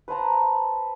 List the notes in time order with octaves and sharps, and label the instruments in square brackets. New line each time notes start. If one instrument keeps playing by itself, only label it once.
[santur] B4 C5 A5 A#5